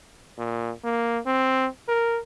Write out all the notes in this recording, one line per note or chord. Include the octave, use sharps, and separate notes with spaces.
A#2
A#3
C4
A#4